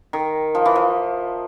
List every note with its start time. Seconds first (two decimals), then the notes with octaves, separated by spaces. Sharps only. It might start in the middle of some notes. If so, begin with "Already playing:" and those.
0.13 D#3
0.55 F3
0.66 E3
0.75 F3